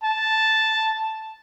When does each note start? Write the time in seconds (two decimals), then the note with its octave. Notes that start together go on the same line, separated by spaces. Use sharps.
0.04 A5